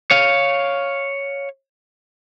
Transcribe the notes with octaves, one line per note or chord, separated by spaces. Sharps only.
C#5 F5